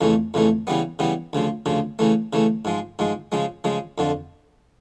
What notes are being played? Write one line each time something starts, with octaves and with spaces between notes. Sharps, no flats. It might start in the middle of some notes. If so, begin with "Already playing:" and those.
F2 C#3 E3 A3
F2 C#3 E3 A3
C#3 E3 G3 B3
C#3 E3 G3 B3
D2 C#3 F3
D2 C#3 F3
C#3 E3 A3
C#3 E3 A3
G#2 F3 G#3
G#2 F3 G#3
C#3 F3 G#3
C#3 F3 G#3
F2 D3 F3